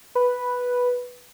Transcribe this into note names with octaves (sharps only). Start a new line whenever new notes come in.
B4